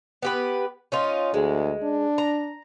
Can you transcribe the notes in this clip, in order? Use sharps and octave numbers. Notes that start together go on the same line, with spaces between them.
B3 G4 B4
C#4 D#4 F4
D2 G#3
D4
A#5